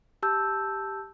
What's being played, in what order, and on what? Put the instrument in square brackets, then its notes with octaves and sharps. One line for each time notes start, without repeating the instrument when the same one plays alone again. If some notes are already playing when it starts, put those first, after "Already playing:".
[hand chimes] G4 A5 E6 G6